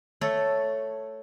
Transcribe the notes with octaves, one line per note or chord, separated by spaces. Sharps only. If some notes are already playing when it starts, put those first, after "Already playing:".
A3 A4 C#5